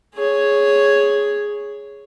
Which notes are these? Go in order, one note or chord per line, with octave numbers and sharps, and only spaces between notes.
G#4 C#5